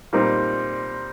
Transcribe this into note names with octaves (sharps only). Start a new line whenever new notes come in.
A#2 G3 C4 D#4